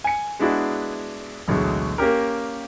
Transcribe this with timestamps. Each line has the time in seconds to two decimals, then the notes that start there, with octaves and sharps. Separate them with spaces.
0.04 G#5 C#7
0.39 G#3 B3 D4 E4 F#4 G#4
1.48 A1 D2 B2 F#3 G#3
1.98 A#3 C#4 G4 A#4